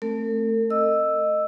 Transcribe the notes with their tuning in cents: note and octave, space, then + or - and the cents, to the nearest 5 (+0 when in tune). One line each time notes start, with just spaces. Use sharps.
A3 +0 C4 +25 A#4 -45
D#5 -10 E6 +0